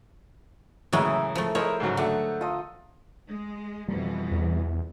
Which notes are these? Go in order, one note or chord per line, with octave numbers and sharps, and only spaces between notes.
A2 C#3 E3 F#3 G#3 A#4 E5 D#6
F3 A3
G#3 E4 A#4 C5 C#5 D#5
G#2 C#3 F#3
D3 F#3 A3 F#5
F4 A4 D#5
G#3
F2 B2 E3 G3
E2